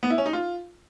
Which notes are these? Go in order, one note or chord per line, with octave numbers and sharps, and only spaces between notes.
B3
E4
C#4
D#4
F4